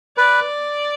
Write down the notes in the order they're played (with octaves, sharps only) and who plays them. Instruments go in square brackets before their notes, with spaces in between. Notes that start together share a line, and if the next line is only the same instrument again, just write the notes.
[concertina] B4 [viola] D5